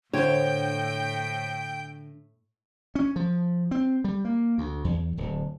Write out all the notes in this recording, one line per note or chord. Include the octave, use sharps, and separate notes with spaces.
A2 D3 C5 C#5 G5
C#4
F3
C4
G3
A#3
D2
E2
D1